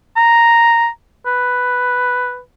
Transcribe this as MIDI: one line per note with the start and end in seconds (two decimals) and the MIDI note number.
0.17 0.88 82
1.26 2.40 71